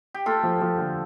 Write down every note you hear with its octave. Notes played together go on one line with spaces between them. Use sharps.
G4
A3 F4 A4
F3
F3
D3